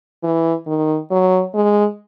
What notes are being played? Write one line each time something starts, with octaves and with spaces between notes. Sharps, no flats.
E3
D#3
F#3
G#3